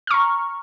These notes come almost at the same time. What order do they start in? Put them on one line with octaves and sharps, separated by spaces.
F6 C#6 A#5